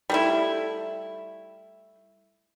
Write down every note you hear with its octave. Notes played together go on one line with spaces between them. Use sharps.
G3 A3 E4